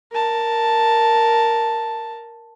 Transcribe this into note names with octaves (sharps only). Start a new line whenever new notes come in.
A#4 A5